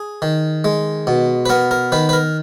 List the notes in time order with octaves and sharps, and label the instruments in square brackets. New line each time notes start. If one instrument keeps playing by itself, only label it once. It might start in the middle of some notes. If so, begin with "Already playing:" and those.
Already playing: [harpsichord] G#4
D#3
G#3
B2
B4
B3 A#4
A#4
D#3 B4
B4
A#4